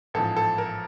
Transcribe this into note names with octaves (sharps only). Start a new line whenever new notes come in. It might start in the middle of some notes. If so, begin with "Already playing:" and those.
A1 G#2 F3 A4
A4
A#4